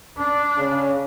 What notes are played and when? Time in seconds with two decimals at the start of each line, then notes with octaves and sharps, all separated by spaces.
0.17 D4
0.58 C#3